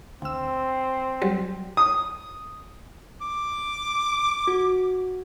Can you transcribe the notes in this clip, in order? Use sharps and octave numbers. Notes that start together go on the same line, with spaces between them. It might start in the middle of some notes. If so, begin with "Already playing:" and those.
D2 C4 E6
F#3 G3
D#6
D6
F#4